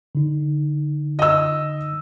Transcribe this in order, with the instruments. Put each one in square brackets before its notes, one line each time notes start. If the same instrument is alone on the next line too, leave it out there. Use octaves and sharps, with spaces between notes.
[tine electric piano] D3 D#4
[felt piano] D#5 E6